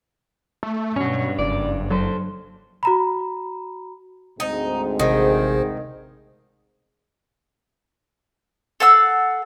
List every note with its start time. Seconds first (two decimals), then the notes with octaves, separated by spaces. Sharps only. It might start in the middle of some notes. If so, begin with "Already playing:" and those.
0.63 A3
0.96 G2 B2 F#3 C#4 C#5
1.39 F#1 D5
1.91 F#3 A4 C5
2.83 F#4 A#5 B5
4.40 D2 G#2 C4 D#4
5.00 A1 C3 D#3 G#4 C5
8.80 A4 F5 F#5 E6